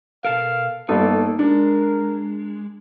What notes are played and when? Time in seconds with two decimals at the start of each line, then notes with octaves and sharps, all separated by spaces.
0.25 B2 A4 A#4 F5
0.89 G1 A#3 D#4 A4
1.39 G#3 D4 A#4